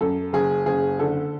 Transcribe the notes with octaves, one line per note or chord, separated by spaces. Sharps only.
F#2 A4
F#1 G#4
F#1 G#4
D3 A4